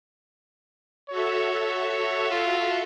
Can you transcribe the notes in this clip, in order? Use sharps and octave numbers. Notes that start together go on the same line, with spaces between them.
F#4 A4 C#5 E5
F4